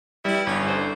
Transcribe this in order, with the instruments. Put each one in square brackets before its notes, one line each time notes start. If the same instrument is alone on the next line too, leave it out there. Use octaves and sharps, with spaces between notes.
[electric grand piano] G3 [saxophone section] E4 B4
[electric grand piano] G1 [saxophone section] C#4 C#5
[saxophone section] D3 C5